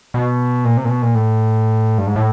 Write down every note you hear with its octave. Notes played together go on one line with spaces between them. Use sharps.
B2
A#2
C3
A#2
B2
A#2
A2
G2
G#2
A2